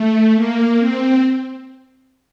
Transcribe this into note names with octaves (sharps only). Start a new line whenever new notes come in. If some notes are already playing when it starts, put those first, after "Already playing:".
Already playing: A3
A#3
C4